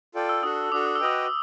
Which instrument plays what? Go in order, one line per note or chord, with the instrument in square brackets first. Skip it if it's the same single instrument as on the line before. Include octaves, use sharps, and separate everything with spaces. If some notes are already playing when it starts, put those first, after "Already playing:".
[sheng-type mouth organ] F4 A4 D5 G5
[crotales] E6
[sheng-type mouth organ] D4 F#4 A4 [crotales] D#6
[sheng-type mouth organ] D4 F#4 A4 [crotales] D6
[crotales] D#6
E6
[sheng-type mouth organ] F#4 B4 D#5 G5 [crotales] D#6